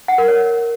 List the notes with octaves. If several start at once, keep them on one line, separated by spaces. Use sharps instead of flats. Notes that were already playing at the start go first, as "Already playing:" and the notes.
F#5
A#4
C#5